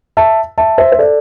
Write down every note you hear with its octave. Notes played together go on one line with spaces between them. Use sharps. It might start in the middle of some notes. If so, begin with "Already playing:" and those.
E5 A5
E5 A5
C5 E5
C5
A4 D5